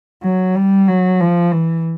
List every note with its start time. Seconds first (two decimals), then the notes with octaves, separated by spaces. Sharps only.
0.23 F#3
0.55 G3
0.88 F#3
1.20 F3
1.52 E3